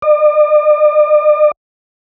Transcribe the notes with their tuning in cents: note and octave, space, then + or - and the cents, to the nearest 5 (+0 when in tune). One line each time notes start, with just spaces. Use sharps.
D5 +45